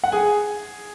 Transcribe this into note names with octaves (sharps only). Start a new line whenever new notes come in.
F#5
G#4 G#5